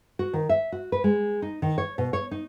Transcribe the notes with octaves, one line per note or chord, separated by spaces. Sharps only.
F#4
D#3
E5
F#4
B4
G#3
D#4
D#3
C#5
B2
C#5
D#4